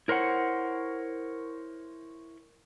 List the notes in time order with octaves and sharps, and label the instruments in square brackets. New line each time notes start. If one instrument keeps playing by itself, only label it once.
[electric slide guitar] E4 A#4 C5 C#5 F#5